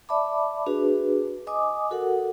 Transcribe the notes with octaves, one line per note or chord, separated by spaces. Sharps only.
D5 E5 A5 B5 D6
D4 F#4 G#4 B4
D#5 G#5 D6 D#6
F#4 A4 A#4 F#5